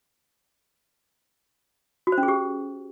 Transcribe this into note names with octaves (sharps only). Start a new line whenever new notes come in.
F#4
C5
C#4
G#4
G4